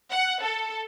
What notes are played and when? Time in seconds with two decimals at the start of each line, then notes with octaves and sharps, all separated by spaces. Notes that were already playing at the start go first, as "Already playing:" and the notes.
0.11 F#5
0.42 A4